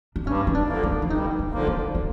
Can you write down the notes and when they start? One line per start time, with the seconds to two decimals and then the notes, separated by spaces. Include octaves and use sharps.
0.16 D4
0.27 G2 C#4
0.47 D#4
0.55 D4
0.68 D3 F3 A#3
0.83 D#4
1.02 E4
1.10 G2 D#4
1.39 D4
1.53 D3 F3 A#3
1.67 D#4
1.95 B3